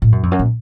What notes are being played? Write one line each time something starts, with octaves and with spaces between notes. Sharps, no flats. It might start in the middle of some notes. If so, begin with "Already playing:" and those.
A2
F#2
F2
F#2
A#2